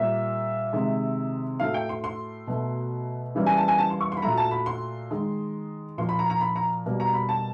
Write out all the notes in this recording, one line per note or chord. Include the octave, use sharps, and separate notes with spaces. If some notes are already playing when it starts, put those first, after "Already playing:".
Already playing: A#2 G3 A#3 E5
C3 D#3 G#3
A2 F#3 A3 F5
G5
C6
C6
B2 F#3 A3
C#3 E3 G3 A#3
G#5
A5
G#5
A5
C6
C#6
C6
B5
A#2 F#3 A3 A#5
A5
B5
C6
D#3 G#3
A#2 F3 A#3 C6
B5
A#5
A#5
B5
A#5
B2 G3 A#3
A#5
B5
A5